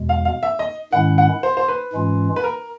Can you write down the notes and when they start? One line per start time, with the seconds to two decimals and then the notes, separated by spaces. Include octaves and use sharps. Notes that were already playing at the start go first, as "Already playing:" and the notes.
Already playing: E2 B2 G#3
0.09 F5
0.25 F5
0.43 E5
0.59 D#5
0.92 G#2 D#3 G#3 C#4 E4 F#5
1.18 F#5
1.43 C5
1.57 C5
1.68 B4
1.93 G#2 E3 G#3 C#4 F4
2.36 B4
2.44 A#4